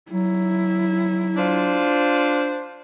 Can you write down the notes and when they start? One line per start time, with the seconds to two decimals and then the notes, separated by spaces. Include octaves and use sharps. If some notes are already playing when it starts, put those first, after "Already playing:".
0.12 F#3 E4
1.36 D4 F4 C5